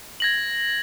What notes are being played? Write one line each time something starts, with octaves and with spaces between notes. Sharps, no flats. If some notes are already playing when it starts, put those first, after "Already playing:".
G#6 A#6 F#7